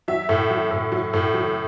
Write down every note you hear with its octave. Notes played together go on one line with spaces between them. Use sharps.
F#3 E5
A2
F#3
A2
F#3
A2
F#3